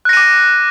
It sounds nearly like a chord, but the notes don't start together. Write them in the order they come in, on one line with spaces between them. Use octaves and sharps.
F#6 A#6 D#7 D6